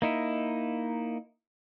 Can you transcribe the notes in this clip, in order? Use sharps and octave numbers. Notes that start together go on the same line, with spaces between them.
A#3 D#4 E4